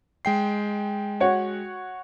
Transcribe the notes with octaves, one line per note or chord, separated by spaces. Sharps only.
G#3 G5 C7
F#4 C#5 F#5